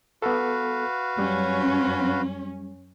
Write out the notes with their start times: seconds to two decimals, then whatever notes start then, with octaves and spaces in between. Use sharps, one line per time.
0.22 B3 F#4 A4 B4 F5
1.19 F#2 G3 C#4